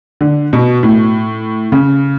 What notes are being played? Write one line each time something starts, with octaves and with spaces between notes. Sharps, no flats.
D3
B2
A2
C#3